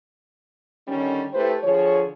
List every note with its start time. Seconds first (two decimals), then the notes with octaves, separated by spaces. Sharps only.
0.88 D3 D#3 G3 C#4
1.34 A3 E4 G4 B4 C5
1.63 D3 F3 G#4 C#5